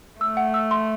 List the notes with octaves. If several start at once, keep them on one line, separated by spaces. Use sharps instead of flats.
A3 E6
F#5
E6
C6